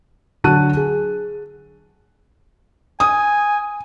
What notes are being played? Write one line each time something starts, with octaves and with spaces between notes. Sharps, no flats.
D3 F#3 F#4 A5 F#6 D#7
G#4
G#5 D#6